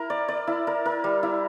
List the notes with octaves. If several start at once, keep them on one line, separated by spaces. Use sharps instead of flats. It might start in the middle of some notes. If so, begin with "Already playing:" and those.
Already playing: E4 A#4
D5
D5
E4
A#4
A#4
G3
E4